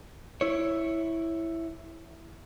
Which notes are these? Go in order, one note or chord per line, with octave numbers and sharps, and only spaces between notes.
E4 C#5